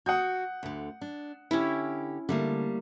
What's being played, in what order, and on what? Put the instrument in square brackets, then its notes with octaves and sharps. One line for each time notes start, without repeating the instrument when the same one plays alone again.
[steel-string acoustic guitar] F#4 [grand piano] F#5 D#6 G6
[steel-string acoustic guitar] D2 D3
D4
[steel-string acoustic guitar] D3 G4 [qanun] C#4 E4
[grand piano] D3 [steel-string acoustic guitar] G3 A3 A#3